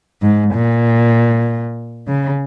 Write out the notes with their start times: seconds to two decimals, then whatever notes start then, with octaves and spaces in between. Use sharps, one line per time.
0.22 G#2
0.53 A#2
2.07 C#3